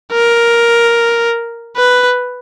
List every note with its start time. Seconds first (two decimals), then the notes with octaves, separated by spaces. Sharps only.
0.13 A#4
1.77 B4